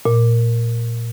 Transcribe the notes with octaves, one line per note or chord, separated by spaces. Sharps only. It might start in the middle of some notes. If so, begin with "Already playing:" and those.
A#2